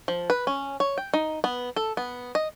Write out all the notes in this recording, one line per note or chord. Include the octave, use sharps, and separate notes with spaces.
F3
B4
C#4
C#5
G5
D#4
B3
A4
B3
D#5